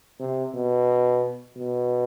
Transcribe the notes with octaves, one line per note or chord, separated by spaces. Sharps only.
C3
B2
B2